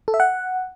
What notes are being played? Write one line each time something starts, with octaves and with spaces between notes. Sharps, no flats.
A4
E5
F#5